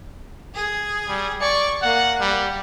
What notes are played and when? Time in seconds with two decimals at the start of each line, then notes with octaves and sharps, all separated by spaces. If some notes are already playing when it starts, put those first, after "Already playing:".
0.55 G#4
1.09 G3
1.41 D5 C#6 C#7
1.82 A#3 F#5
2.21 G3